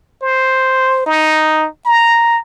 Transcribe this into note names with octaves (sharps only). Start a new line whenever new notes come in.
C5
D#4
A#5